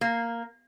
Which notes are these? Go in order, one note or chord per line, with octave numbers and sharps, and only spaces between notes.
A#3